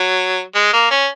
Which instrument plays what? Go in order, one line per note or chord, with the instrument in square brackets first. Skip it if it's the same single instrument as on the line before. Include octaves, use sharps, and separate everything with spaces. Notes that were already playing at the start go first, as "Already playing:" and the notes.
Already playing: [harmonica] F#3
G#3
A#3
C#4